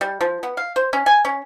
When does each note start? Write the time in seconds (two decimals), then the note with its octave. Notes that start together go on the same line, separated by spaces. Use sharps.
0.01 G3
0.21 F3
0.43 B3
0.57 F5
0.76 C5
0.93 C#4
1.06 G#5
1.25 C#4